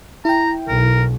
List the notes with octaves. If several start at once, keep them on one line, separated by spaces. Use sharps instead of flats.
E4 G5 A#5
B1 A#4